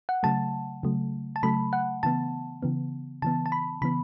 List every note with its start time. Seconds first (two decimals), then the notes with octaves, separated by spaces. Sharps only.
0.09 F#5
0.23 C#3 F#3 A3 A5
0.83 C#3 F#3 A3
1.36 A5
1.43 C#3 F#3 A3 B5
1.73 F#5
2.03 C#3 E3 B3 A5
2.62 C#3 E3 B3
3.22 C#3 E3 B3 A5
3.46 A5
3.52 B5
3.82 C#3 E3 B3 B5